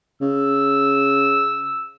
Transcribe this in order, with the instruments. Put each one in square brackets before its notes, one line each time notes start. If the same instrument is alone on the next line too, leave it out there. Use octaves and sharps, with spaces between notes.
[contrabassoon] C#3 [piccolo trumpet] E6